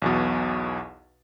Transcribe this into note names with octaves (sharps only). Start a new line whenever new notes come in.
B1 E2 B2